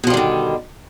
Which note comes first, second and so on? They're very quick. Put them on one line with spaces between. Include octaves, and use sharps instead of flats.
B2 F3 G3 D#3 D3